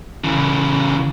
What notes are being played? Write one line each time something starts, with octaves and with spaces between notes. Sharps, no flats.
C#3 E3